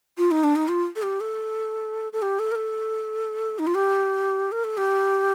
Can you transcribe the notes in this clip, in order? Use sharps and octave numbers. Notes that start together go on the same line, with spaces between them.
F4
D#4
D4
D#4
F4
A4
G4
A4
A4
G4
A4
A#4
A4
D#4
F4
G4
A#4
A4
G4